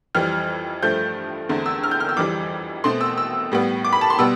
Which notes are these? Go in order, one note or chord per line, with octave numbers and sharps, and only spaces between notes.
F2 E3 G3 F6
G2 F3 A3 G6
E2 D3 A3 C4
E6
F6
G6
F6
E6
F2 E3 G3 D6
B2 A3 C4 C6
E6
E6
A2 G3 B3
D6
B5
A5
C6
B2 G3 B3 E6